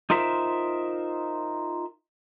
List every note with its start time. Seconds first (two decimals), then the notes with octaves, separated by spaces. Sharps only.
0.10 D#4 F4 A#4 C5 E5